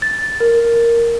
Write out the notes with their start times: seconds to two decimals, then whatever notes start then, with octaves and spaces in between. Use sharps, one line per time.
0.02 A6
0.40 A#4